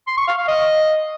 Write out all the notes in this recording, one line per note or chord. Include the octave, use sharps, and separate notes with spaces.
C6
C#6
F5
F5
D#5